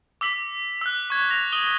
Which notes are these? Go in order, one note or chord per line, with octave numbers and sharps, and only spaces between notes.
D6 E6 B6 F#7
E6 F#6
C#6 G#6
G#6 A#6 F7
D#6 D#7 G7